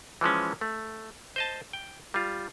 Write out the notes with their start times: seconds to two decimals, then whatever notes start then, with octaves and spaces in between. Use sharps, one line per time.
0.21 E3 F3 G#3 C#4
0.61 A3
1.36 C5 D#5 A5
1.73 G5
2.14 G3 F4